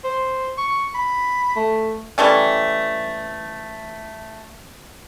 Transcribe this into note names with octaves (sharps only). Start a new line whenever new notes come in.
C5
C#6
B5
A3
E3 G3 A3 C#4